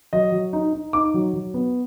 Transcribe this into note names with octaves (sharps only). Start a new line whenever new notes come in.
F#3 D#5
F#3
D#4
D#4
D#4 D6
F#3
F#3
B3